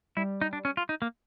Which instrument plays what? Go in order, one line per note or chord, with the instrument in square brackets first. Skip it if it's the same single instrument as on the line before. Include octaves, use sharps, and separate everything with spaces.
[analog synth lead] G3 [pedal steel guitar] E4
[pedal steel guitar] D#4
D4
C#4
F4
D#4
A#3